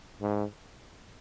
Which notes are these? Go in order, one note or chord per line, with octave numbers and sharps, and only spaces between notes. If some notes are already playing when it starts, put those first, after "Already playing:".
G#2